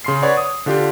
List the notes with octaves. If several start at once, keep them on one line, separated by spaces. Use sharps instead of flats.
C#3 C6 C7
B4 C#5 D5 F#5
D#6
D3 D4 F4 G4